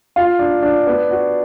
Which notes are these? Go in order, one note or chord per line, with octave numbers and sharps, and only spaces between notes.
F4
D4
D4
B3
F#4